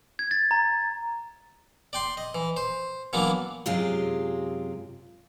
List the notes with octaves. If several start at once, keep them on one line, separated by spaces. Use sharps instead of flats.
G#6
A6
A#5
D5 G5 C6
D#5
E3
C5
E3 F#3 A#3 B3 D4
F#2 C3 G#3 F4 G4 G#4